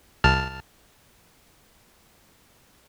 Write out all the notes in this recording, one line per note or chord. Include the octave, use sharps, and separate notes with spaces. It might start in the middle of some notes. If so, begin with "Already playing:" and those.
C2 A5 F6